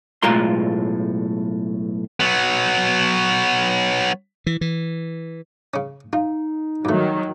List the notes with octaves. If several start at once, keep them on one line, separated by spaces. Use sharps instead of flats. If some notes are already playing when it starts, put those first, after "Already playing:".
B1 A2 G#3 F4 A#5 C6
F#3 B3
E3
E3
C#3 C#4
D#4 F4
G2 D#3 F#3 A3